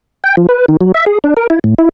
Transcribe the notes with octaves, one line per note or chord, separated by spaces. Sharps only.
G5
F3
B4
D#3
F#3
E5
G#4
D4
A#4
E4
A2
E4